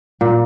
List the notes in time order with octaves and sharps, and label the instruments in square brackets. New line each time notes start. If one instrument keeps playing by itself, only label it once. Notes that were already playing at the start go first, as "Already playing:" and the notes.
[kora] A#2